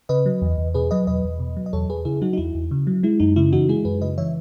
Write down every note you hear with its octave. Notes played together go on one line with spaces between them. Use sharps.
C#3 B4 D#5
F#3
E2
E2
B2 G#4 B4
F#3 B4 D#5
E2 B4 D#5
E2
B2
F#3
D#5
E2 A4 C#5
E2 G#4 B4
C#3 E4 G#4
F#3 D#4 F#4
D#4
E2 E4
E2
C#3
F#3
G#3 E4
F#2 D#4
C#3 E4
E3 D#4 F#4
G#3 E4 G#4
F#2 G#4 B4
C#3 B4 D#5
E3 C#5 E5